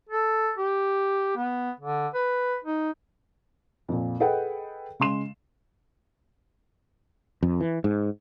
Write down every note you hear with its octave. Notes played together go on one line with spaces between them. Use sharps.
A4
G4
B3
D3
B4
D#4
F2 A#2
G#4 A4 B4 D#5 F#5 G5
C#3 G#3 C6 E7
F2
E3
G#2